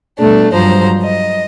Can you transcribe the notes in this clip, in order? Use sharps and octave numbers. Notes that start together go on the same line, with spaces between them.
B2 G3 A3 D4
G2 F3 F#3 C5 A#5
D#5